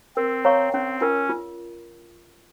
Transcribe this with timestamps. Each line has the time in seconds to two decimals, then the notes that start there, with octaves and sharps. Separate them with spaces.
0.17 C4 A#4
0.45 C#5 F5 A#5 C#6
0.73 C4 C#4
1.01 C#4 F4 A#4
1.30 F4